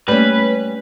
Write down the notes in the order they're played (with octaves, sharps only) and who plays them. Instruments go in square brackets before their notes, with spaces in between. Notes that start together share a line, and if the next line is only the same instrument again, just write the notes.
[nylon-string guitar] G3 C#4 [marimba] A3 A#3 C#5 [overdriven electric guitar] B4